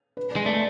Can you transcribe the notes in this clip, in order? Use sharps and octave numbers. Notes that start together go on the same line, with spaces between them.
B4
D5
G#3
A3 D5